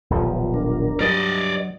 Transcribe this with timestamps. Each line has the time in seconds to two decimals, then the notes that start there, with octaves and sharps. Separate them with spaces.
0.10 D#1 B1 F3
0.54 D4 A#4
1.00 G2 F#3 D5 D#5